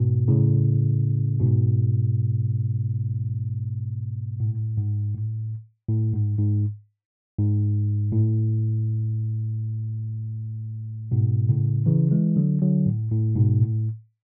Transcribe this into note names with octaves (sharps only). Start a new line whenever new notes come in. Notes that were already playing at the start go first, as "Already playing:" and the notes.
Already playing: G#2 B2
A2 C#3
G#2 B2
A2
G#2
A2
A2
G#2
G#2
G#2
A2
G#2 B2
A2 C#3
C#3 E3
E3 G#3
D3 F#3
D3 F#3
A2
A2
G#2 B2
A2